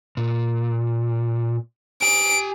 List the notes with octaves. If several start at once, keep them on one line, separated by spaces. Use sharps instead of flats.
A#2
G4 G#5 D7